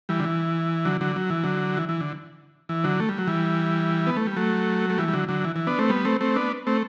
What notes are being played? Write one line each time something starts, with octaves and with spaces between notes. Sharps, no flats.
E3 G3
D3
E3
D3 F#3
D3 F#3
F#3
E3
D3 F#3
E3
E3
D3
E3
D3 F#3
A3
G3
F#3
E3 G3
B3
A3
G3
F#3 A3
A3
E3 G3
G3
D3 F#3
D3 F#3
E3
E3
B3 D4
A3 C4
G3 B3
A3 C4
A3 C4
B3 D4
A3 C4